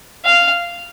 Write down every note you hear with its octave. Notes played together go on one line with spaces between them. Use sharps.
F5